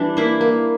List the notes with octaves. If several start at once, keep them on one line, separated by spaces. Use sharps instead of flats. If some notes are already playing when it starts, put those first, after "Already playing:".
Already playing: E3 G3 D4
A#3 E4
A#3